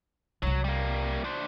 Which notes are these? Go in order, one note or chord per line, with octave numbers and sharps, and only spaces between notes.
C2 F#3 C4
G3 A#3
D4 C5